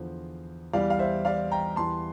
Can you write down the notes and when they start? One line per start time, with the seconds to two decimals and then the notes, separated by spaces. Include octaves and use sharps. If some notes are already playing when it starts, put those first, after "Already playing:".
Already playing: E2 D3 F3 C5
0.73 E2 E3 G3 D5 F5
0.90 F5
0.99 C5 E5
1.25 D5 F5
1.51 G5 A#5
1.76 E2 E3 G3 A5 C6